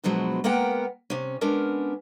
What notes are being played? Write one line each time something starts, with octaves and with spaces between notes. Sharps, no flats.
G2 B2 F3 F#3 G#3
G#3 A#3 B3 A#4 F#5 G5
C3 C#4
G#3 B3 C#4 D4 A#4